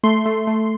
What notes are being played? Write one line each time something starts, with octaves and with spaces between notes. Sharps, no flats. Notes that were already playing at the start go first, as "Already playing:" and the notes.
A3 C6
A3
A3